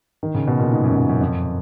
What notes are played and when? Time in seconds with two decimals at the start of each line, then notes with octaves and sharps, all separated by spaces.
0.23 D#3
0.35 C#3
0.47 B2
0.60 A#2
0.72 G#2
0.84 F#2
0.97 F#2
1.09 F#2
1.21 F2